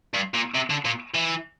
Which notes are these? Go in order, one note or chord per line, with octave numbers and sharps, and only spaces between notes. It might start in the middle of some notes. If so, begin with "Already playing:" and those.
G2
A#2
C3
D3
A#2
E3